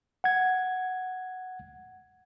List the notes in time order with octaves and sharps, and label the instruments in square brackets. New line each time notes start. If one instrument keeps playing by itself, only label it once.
[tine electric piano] F#5 G#6